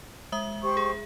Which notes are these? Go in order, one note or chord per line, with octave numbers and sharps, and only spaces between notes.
G#3 E5 D#6
G4 C5 C#6
G#4